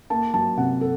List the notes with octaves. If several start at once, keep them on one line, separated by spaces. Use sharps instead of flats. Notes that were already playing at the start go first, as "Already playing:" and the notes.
A#3 A5
F#3 A5
C3 F#5
A4